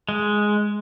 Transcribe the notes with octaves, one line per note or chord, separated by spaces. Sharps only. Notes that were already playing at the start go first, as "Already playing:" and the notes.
G#3